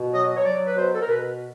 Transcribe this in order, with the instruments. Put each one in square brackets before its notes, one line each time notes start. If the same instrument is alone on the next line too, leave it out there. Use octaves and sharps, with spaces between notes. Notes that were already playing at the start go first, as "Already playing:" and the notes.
Already playing: [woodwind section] B2
F#3 D#5
C#5
F#3 D5
B4
B2 C5
A4
A#4
B2 B4